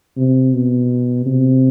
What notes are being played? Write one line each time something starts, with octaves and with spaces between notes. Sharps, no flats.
C3
B2
C3